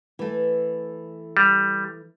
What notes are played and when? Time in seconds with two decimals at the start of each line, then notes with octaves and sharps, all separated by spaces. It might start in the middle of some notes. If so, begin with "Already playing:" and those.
0.19 E3 A3
1.37 G3